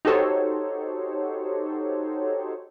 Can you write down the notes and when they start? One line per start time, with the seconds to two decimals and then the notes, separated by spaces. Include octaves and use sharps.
0.05 D#4 F#4 G4 A4 C5 C#5